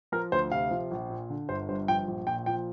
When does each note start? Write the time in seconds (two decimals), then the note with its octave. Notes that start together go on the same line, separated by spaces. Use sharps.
0.12 F3 A#4
0.32 D2 C5
0.51 C3 F5
0.71 F3
0.91 A#1
1.10 A#2
1.30 D3
1.49 G1 C5
1.69 G2 C5
1.88 F3 G5
2.08 A#1
2.27 A#2 G5
2.46 F3 G5